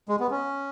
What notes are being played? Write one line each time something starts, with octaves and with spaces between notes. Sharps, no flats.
G#3
B3
C#4